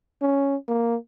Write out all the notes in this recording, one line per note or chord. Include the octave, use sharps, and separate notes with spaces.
C#4
A#3